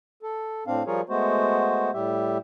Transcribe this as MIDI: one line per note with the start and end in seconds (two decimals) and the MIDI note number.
0.22 0.64 69
0.67 0.83 45
0.67 0.83 60
0.67 0.83 62
0.67 0.83 77
0.87 1.01 53
0.87 1.01 55
0.87 1.01 65
0.87 1.01 68
0.87 1.01 70
0.87 1.01 73
1.09 1.91 56
1.09 1.91 57
1.09 1.91 59
1.09 1.91 66
1.09 1.91 72
1.93 2.38 45
1.93 2.38 55
1.93 2.38 67
1.93 2.38 76